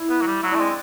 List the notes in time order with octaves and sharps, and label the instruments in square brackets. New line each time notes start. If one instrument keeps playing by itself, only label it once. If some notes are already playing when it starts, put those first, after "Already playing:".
Already playing: [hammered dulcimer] E4
[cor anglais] B3
F#3
G3
[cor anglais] F#3 [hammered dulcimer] E4
[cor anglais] A3 [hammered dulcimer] D4
[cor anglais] G#3 [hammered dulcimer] C4